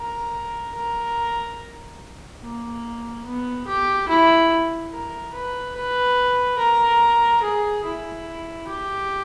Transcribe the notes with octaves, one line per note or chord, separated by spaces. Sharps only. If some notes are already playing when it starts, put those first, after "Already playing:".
Already playing: A#4
A#4
A#3
B3
G4
E4
A#4
B4
B4
A#4
G#4
E4
G4